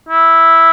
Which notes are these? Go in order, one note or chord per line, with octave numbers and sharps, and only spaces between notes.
E4